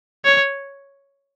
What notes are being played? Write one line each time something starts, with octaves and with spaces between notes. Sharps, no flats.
C#5